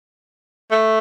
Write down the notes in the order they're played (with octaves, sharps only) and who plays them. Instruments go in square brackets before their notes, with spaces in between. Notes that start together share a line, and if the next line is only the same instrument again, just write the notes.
[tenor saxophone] A3